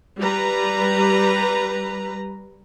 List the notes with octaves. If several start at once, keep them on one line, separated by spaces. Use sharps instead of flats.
G3 B4 A#5